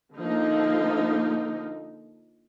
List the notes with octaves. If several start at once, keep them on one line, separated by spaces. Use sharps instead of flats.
D3 F3 A#3 D#4